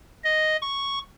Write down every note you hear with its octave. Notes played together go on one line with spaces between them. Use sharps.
D#5
C#6